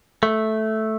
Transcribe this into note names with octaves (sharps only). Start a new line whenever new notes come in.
A3